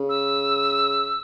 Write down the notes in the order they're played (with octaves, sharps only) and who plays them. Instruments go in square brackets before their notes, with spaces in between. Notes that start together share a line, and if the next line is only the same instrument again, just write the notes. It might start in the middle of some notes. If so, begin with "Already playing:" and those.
Already playing: [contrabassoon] C#3
[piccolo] E6